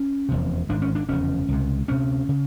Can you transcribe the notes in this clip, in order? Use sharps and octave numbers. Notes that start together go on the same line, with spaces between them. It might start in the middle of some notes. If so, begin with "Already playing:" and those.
Already playing: C#4
F1 E2 C3
G#1 G#2 D4
C#4
D4
F1 E2 C#3 C#4
C#2 C3
D2 C3 C#4
C#3